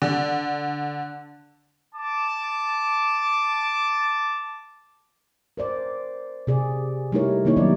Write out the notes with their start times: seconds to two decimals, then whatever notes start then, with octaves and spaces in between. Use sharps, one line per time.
0.02 D3
1.95 A5 D6
5.57 A#4 C5 D5
6.47 C3 G#4 D5
7.12 G3 A3 D#4 E4 A#4 C#5
7.45 D#3 A#3 D#4 E4 C#5
7.56 D#3 F#3 G3 B3 D4 D5